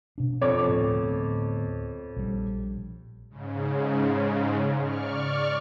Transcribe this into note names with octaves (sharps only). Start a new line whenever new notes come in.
B2 D4
F2 C#5 D6
D2 A2 B3
A#1 G3
G#2 C#3
D5 C#6 F6